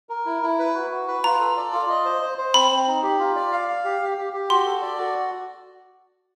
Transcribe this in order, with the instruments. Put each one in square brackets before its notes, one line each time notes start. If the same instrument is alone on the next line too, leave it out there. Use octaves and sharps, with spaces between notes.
[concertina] A#4
E4
E4
B4
F#4
F#4
B4
[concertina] F4 [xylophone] A#5
[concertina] A4
D5
F4
D#5
C5
C5
C5
[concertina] C4 [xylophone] B5
[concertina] C4
D#4
G4
F4
D5
F5
F5
G4
G4
G4
G4
[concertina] F#4 [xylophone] C6
[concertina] A4
D5
F#4